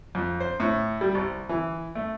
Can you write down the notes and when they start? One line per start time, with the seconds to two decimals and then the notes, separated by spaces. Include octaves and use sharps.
0.15 F2
0.40 C5
0.60 A2
1.01 G3
1.15 C2
1.49 E3
1.95 A3